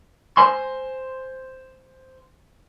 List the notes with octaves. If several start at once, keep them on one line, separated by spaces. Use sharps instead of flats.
C5 G#5 C6